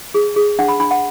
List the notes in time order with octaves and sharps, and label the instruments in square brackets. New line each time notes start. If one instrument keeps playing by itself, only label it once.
[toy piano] G#4
G#4
D4 F#5
B5
D4 B5
F#5